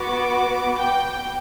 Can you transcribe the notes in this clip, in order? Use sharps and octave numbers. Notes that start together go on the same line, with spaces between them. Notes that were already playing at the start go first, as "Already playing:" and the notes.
Already playing: B3 F#4 D6
G5